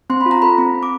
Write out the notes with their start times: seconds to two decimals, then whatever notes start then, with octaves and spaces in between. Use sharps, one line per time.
0.10 C4 C6
0.21 B5
0.26 F4
0.31 A#5
0.42 A4 B5
0.58 C4 B5
0.74 C4
0.83 D6